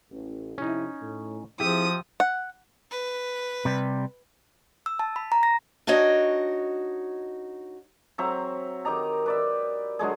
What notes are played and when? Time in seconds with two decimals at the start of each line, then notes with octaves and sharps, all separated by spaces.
0.11 A1
0.58 F2 C3 C#4 D#4 E4
1.02 A2
1.60 F3 C4 E4 G4 G#4 E5 D#6
2.20 F#5
2.91 B4
3.65 C3 G3
4.86 E6
4.99 A5
5.16 B5
5.32 A#5
5.43 A#6
5.87 D4 D#4 F#4 C#5 D#5
8.18 F#3 C4 E5 A#5
8.85 D#3 G4 D#5 A#5
9.26 B4 D5 E5
9.99 D3 F#3 G#3 G#4